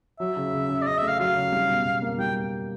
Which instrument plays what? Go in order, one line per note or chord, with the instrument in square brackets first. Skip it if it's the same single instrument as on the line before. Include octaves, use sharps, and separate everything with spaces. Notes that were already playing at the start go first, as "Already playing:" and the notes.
[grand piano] F#3 [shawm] E5
[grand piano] C#3
C#3
C#3
[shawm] D5
[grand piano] C#3 [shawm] D#5
[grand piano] A3 [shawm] E5
[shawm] F5
[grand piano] F#3 [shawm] F5
[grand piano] C#3
G3
B2
B2
A#3
[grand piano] G3 [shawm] G5